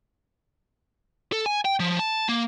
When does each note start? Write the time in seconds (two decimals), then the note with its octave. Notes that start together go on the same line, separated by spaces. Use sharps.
1.32 A4
1.46 G#5
1.65 G5
1.80 F3
1.99 A5
2.29 A#3